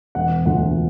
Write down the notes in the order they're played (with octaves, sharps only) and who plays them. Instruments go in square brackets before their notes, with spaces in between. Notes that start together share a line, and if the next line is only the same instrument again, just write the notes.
[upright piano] E1 F#5
D2 F#5